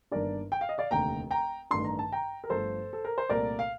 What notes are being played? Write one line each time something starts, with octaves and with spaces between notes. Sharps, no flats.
G1 G2 D#3 A#3 D4 A#4 D5
G5
F5
D#5
D5 F5
F1 D#2 D3 G5 A#5
G5 A#5
A1 G2 D#3 A3 D4 C6
A#5
A5
G5 A#5
A#4
G1 G2 F3 A3 A4 C5
A4
A#4
C5
C2 A#2 A3 A#4 D5
F5